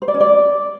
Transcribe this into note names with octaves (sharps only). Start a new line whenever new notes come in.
C5
D5
C#4
D5